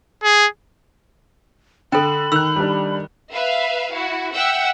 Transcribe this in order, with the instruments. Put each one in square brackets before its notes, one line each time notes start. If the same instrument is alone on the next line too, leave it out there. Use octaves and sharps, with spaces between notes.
[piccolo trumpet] G#4
[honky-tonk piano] D3 [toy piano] A4 G5 [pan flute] B5
[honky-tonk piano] D#3 F#6 [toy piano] E6
[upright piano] G3 D4
[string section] B4 E5 F5
E4 F#4
E5 F#5 G5 E6